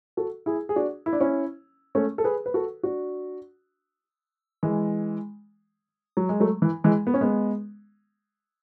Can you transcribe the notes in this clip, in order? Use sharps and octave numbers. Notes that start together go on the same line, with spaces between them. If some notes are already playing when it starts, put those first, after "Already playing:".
F#4 A4
E4 G#4
G#4
D4 F#4
E4
D4
C#4 E4
A3 C#4
A4
G#4 B4
B4
F#4 A4
D4 F#4
E3 G#3
F#3
G#3
F#3 A3
E3
E3 G#3
B3
C#4
G#3 B3